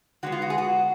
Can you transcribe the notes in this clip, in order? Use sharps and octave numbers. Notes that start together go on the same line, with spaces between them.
D3 G#3 B3 F#4
F4
F#4
G#4
F#4